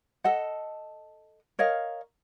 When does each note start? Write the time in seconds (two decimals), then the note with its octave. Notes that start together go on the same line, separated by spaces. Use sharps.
0.24 A4 D#5 F#5
1.59 A#4 C#5 D#5 F5